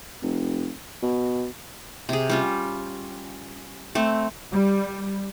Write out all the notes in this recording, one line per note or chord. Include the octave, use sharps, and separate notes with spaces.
F1
B2
C3 G#4
G3 C#4 F4
A3 C4
G3